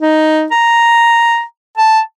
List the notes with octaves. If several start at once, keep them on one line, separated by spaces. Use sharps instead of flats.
D#4
A#5
A5